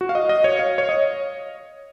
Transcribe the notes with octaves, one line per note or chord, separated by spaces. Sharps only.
F#4
F5
D#5
D#5
C#5
F5
C#5
D#5